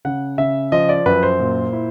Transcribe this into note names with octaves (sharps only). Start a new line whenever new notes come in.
C#3 F#5
C#3 E5
F3 D#5
D5
F#2 B4
C5
A#2
E4